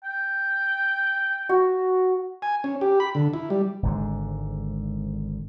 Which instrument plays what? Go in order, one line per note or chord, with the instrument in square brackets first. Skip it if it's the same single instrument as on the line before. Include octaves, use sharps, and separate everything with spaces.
[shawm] G5
[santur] F#4
[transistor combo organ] G#5
C#4
G4
B5
D3
E4
G3
[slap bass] G#1 G#2 D3